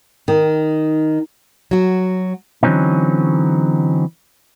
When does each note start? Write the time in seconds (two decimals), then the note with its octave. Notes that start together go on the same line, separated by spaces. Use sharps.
0.28 D#3
1.71 F#3 F#4
2.63 D3 E3 F#3 C4 C#4 D#4